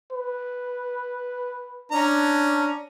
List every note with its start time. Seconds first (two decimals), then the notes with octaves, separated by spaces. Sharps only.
0.13 B4
1.92 C#4 D4 A#5